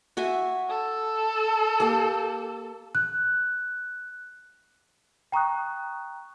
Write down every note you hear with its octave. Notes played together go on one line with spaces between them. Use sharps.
F#4 E5 G#5
A4
A#3 G4
F#6
G5 A#5 C#6 D#6 F#6